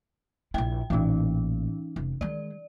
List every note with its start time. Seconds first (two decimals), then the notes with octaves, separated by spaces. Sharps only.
0.54 A#1 E4 G5
0.90 A1 A#2 E3 C#4 D#4
1.96 F1
2.21 D#3 G#3 D5